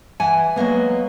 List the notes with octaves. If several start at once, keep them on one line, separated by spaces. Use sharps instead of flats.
E3 F#5 G#5
F#3 G#3 A#3 B3